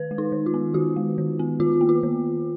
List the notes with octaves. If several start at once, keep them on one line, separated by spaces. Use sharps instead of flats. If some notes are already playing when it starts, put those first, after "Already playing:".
Already playing: D#3 B4
G#3
D#4
D#3
F4
B3
D#3 F#4
G#3
D#3
B3
D#3 F4
A#3
F4
D#3